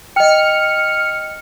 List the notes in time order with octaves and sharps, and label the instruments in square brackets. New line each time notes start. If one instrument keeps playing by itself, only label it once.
[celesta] D#5 G5 [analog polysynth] F6 C#7